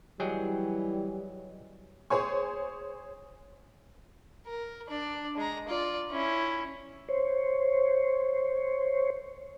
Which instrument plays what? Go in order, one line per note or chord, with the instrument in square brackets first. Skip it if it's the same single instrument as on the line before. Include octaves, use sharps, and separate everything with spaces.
[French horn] E3 [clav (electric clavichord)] F#3 G#4 G5 [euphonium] G3 [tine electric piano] C#5 D#5
[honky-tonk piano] G#4 C5 C#5 G#5 C#6
[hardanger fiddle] A#4
D4 D5
G#3 A#5
F4 D5
C#4 E4
[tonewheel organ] C5 C#5